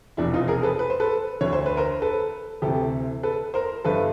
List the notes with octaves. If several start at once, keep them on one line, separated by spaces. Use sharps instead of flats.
F1 E2 B2 D4 E4
D#4 F4
G#4 A#4
A4 B4
B4
C5
A4 B4
D2 D3 C#5
C5
B4
A#4 C5
A4 B4
D2 C3 E3 G4 A4
A4 B4
A#4 C5
G1 G2 D3 A4 B4